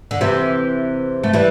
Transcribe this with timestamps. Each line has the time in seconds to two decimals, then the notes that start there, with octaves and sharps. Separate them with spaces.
0.11 D3
0.21 C3 E3
1.24 A3
1.33 E3 G3